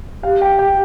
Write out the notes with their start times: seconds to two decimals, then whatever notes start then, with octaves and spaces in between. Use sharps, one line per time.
0.23 G4 F5
0.41 G5
0.59 G5